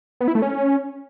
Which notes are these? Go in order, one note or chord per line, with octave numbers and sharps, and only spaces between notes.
B3
E4
A3
C#4